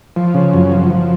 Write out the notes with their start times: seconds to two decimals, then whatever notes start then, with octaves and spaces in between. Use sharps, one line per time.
0.16 F3
0.34 C#3
0.53 F#2
0.72 F3
0.90 F3